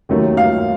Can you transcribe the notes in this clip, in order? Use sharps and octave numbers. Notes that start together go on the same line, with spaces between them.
D#2 D#3 F#3 A3
F5